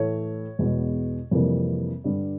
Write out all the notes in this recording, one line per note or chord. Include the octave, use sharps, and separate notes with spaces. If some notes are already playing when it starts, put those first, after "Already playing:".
Already playing: A2 E3 A3 C#5
E2 B2 G#3
F2 C3 E3 G3 A#3
G2 D3 G3